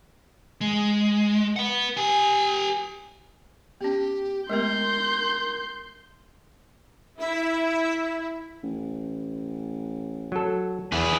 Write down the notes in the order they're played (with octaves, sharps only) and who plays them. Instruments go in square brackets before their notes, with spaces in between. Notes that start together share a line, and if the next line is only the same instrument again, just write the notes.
[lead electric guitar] G#3
B4 F#5
G4 G#5
[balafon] B3 C#4 [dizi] G4
[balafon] G#3 A3 B3 [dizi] A#4 [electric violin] C6 G6
[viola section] E4 [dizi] E5
[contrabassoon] A1
[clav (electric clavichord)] F#3 A4
[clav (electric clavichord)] E2 [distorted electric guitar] G#4 B4